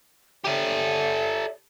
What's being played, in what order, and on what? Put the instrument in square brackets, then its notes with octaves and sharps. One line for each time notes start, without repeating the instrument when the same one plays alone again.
[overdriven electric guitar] G4 A4 [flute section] C#5 D5 E5